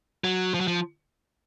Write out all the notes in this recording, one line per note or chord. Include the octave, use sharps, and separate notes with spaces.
F#3
F3
F#3
F3